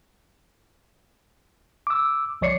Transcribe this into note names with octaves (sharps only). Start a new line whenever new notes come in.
D6 E6
C2 F3 C#5 D5 C7 C#7